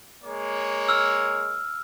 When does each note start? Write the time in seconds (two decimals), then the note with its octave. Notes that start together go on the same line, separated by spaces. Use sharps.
0.24 G#3 A#3 C#5
0.89 E6 F6